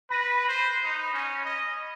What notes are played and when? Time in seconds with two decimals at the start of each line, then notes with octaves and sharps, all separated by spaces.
0.10 B4 B5 A#6 D#7
0.49 C5
0.84 D#4
1.14 C#4
1.45 D#5